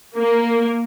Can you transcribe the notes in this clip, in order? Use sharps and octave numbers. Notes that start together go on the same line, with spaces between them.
A#3